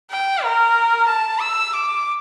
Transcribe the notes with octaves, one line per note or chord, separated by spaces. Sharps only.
G5
A#4
A5
E6
D6